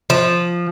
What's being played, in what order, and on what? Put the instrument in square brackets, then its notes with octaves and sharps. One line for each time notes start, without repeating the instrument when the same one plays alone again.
[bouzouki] F3